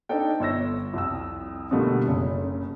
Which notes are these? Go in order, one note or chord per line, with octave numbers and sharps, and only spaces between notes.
C4 D4 D#4 A4 G5
G1 C#5 E6 A#6
C2 F2 E6
B2 D3 F3 G3 A3 A#3
F#1 C#3